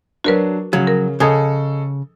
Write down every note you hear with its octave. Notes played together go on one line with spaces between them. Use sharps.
F#3 D4 F#4 A#4 B4
C#3 F3 F#3
A#4
C#3 G#4 A4 D#5 G#5 D#6 G#6